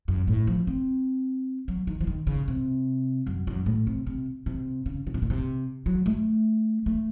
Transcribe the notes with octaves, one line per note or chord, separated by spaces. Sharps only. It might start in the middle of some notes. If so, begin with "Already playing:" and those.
F#2
A2
F3
C4
F#3
D#3
F3
D#3
C#3
C3
F#2
F#2
A2
C3
C3
C3
C#3
C#3
C3
A#2
C3
F#3
A3
A3